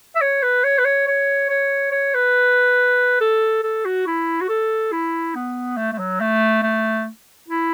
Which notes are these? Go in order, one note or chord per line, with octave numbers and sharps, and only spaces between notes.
E5
C#5
B4
C#5
B4
C#5
C#5
C#5
C#5
B4
A4
A4
F#4
E4
F#4
A4
E4
B3
A3
A3
F#3
A3
A3
E4